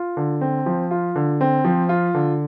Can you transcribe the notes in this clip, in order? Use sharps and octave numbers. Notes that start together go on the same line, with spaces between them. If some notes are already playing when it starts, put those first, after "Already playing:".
Already playing: F4
D3
C4
F3
F4
D3
C4
F3
F4
D3